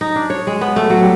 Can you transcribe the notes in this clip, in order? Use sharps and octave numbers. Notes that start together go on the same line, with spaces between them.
D#4
D4
C#5
G#3
B3
A3
F#3
G3